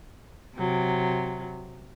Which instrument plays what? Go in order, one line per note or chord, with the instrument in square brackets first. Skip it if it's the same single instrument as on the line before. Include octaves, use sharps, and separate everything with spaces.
[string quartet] C3 F#3